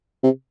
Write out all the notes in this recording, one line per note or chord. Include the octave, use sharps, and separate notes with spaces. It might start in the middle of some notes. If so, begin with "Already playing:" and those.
C3